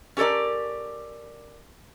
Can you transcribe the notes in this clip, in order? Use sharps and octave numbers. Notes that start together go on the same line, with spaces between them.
C#4 G4 A4 A#4 D5